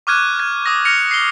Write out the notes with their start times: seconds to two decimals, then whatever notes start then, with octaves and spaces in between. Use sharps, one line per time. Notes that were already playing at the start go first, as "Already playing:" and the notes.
0.07 C#6 D6 F6 F#6 G#6 D#7
0.40 G#6
0.66 D6 D#6 A#6
0.85 F6 A#6 C#7 F7
1.11 C7 G7